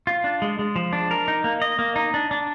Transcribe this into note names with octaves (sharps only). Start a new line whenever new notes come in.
F4
D4
G#3
G#3
F3
D4
A#4
D#4
A#3
D#5
A#3
D#4
D4
D4